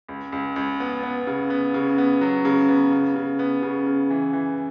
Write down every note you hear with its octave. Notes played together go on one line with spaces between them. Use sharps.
C#2
C#2
C#2
B3
B3
C#3
B3
C#3
B3
F#3
C#3
B3
C#3
C#3
B3
C#3
C#3
E3
E3